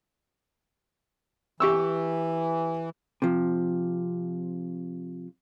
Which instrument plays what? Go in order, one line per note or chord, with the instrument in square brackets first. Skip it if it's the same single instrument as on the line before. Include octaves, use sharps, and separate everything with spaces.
[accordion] E3 [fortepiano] G4 C#6 E6
[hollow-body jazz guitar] C3 F3